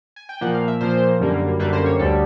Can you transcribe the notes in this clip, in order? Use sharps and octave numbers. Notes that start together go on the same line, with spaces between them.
G#5
G5
A#2 F3 A#3 F#5
F5
E5
A#2 F3 A#3 C5
F#2 D3 G3 A#3
F#2 D3 G3 A#3 B4
C5
C#5
D2 D3 G3 A4